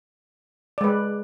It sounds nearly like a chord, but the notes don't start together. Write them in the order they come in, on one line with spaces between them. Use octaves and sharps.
D5 G#3 B4